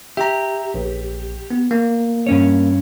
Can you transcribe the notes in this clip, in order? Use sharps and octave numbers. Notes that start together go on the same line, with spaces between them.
G4 E5 A#5
A#1
B3
A#3
G2 C#4 C#5